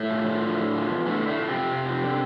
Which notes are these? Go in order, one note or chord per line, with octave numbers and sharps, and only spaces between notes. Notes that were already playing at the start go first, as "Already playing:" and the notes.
Already playing: A2 A3
F3
F3
D3
D3
F3
E2
A2 D3 A3
D3
A2 A3
F3
C3 C4
F2
F2
F3
D3